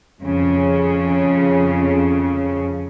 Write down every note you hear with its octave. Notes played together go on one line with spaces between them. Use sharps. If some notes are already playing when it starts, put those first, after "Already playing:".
F2 C#3